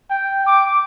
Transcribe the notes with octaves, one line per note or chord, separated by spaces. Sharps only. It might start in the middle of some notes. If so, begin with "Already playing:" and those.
G5
D6